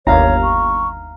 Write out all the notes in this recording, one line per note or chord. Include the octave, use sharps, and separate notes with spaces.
G1 D#2 C#5 F5 A#5
C#6